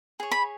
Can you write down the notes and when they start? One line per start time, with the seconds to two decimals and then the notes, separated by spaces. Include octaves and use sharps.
0.20 G#4 C#5
0.32 B5